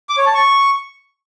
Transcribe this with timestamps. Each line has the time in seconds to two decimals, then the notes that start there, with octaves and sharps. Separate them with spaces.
0.09 D6
0.18 C#5
0.26 A5
0.34 C#6